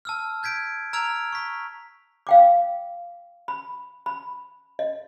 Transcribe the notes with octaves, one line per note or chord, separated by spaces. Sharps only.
A5 E6 F6
G6 G#6 B6 D7
A#5 E6 F6 G#6 D7 F7
C#6 B6
F5 G5 D6
B5
B5
D#5